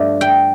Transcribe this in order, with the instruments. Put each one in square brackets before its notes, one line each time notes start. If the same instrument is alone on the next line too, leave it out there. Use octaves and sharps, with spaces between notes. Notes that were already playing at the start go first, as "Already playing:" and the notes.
Already playing: [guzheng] G2 F3 A3 D5
G5